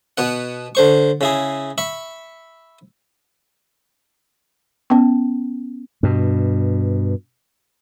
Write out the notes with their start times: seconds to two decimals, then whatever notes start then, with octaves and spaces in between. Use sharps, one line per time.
0.18 B2 B3 F#5
0.75 D3 C5 C#6
1.21 C#3 E4 G#4
1.78 E5 B5 C#6
4.90 B3 C#4
6.03 G2 B2